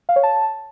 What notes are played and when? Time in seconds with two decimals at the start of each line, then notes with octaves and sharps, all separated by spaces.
0.09 F5
0.16 C#5
0.23 A5